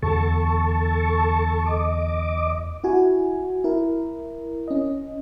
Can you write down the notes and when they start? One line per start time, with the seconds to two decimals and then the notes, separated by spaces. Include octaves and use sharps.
0.02 E2 D3 A4 A5 C#6
1.66 D#5 D6
2.84 E4 F#4 G#5
3.64 E4 A#4
4.68 C#4 D#5